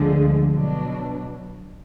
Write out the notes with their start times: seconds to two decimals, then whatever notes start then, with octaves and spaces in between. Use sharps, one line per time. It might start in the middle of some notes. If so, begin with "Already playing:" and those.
Already playing: D2 D3 F3 G#3
0.51 B2 F#3 D4